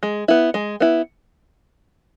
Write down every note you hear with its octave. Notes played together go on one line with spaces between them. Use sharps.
G#3
B3 E4
G#3
B3 E4